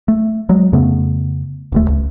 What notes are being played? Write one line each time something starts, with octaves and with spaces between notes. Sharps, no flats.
A3
F#3 G#3
F2 C#3 A3 B3
D1 D#2 A3
C#2